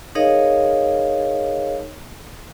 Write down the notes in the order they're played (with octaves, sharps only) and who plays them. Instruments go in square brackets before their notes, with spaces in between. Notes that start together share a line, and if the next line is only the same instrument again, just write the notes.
[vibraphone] D#4 G#4 A#4 C#5 D#5 F5